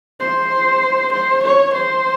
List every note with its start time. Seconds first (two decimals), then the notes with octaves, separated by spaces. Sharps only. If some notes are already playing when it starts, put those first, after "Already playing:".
0.20 C5
1.12 C5
1.43 C#5
1.74 C5